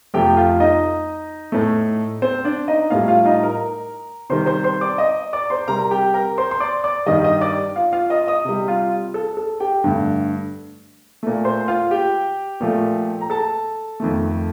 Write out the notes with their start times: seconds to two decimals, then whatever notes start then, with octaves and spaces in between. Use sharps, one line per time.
0.14 F2 C3 F3 A3 G4 G5
0.36 F4 F5
0.60 D#4 D#5
1.52 A2 A3
2.22 C4 C5
2.45 D4 D5
2.68 D#4 D#5
2.90 A2 G3 F4 F5
3.08 F4 F5
3.25 D#4 D#5
3.43 A#4 A#5
4.29 C3 D#3 G3 C5 C6
4.46 C5 C6
4.64 C5 C6
4.81 D5 D6
4.98 D#5 D#6
5.33 D5 D6
5.50 C5 C6
5.68 C3 G3 A#4 A#5
5.91 G4 G5
6.14 A#4 A#5
6.38 C5 C6
6.51 C6
6.60 D5 D6
6.84 D5 D6
7.06 G2 D#3 G3 D#5 D#6
7.24 D#5 D#6
7.41 D5 D6
7.76 F4 F5
7.93 F4 F5
8.10 D#5 D#6
8.27 D#5 D#6
8.45 C3 G3
8.68 F4 F5
9.14 A4
9.37 A4
9.60 G4 G5
9.84 G2 D3 A3
11.23 A#2 A3
11.45 C5 C6
11.68 F4 F5
11.91 G4 G5
12.60 A#2 F3 A3
13.21 A#5
13.30 A4 A5
14.00 F2 D#3 A3